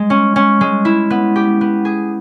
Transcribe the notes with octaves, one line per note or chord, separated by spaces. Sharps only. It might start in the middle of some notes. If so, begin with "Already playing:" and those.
Already playing: G#3
C#4
C#4
G#3
E4
B3
G4
B3
G#4